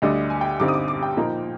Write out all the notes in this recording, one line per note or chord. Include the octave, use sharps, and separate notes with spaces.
D2 D3 G3 D4 D#5
G#5
G5
G2 D3 G3 C4 D#4 D6
D#6
D6
D6
G5
A#2 F3 A#3 D#4